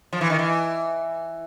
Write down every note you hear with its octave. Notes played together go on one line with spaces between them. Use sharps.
F3
E3
D#3
E3